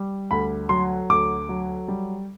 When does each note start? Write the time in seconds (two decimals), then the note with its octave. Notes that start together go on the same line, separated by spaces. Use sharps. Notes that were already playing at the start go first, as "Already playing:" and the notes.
Already playing: G3
0.31 D2 B5
0.69 F#3 C6
1.09 D2 D6
1.49 F#3
1.88 G3